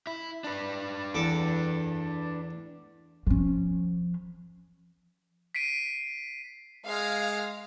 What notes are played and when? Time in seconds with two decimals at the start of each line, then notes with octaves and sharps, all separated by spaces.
0.07 E4
0.44 D4 B4
1.15 E2 A4 D6
3.27 F3 C#4
5.55 B6 C7 D7 D#7
6.86 G#3 F5